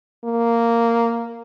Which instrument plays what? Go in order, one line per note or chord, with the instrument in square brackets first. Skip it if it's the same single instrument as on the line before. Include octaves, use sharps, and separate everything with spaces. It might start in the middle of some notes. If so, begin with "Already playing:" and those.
[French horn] A#3